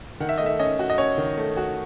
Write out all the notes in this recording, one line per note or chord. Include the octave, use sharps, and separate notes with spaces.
D#3 F#5
E5
A3 D#5
E5
C#4 D#5
F#4
D#5
C#4 C#5
D#3
A3
F#4